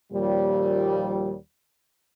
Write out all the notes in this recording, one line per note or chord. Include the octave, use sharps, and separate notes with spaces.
D#2 A#2 F3 G3